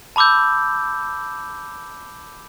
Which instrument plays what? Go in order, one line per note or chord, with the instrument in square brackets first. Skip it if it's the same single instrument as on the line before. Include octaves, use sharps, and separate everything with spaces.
[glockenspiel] A5 B5 D6 E6 G6